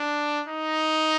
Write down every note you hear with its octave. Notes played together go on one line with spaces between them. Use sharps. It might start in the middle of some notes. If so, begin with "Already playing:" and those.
Already playing: D4
D#4